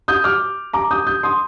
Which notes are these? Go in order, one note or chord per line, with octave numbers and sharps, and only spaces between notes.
D#6 G6
D6 F6
A#5 D6
D#6 G6
D#6 G6
C6 D#6